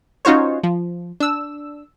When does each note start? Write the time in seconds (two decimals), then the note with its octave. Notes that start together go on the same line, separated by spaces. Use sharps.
0.25 C#4 D#4 F4 F#4 C5 C#5
0.63 F3
1.20 D4 E6